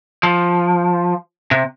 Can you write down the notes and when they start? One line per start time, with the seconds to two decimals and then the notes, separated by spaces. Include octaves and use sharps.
0.23 F3
1.51 C3